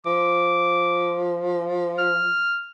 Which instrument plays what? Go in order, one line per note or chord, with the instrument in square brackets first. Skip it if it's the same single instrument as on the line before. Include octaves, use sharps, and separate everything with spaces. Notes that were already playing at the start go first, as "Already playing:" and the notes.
[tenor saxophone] F3 [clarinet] D6
[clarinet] F6